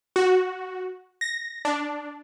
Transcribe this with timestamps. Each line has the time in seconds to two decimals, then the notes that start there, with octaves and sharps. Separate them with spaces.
0.16 F#4
1.21 A#6
1.65 D4